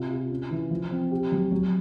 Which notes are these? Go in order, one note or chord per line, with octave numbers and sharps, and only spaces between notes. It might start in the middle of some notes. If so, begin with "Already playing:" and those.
Already playing: C3 F4
F4
C#4
E3
F3
C4
G4
F#3
F#3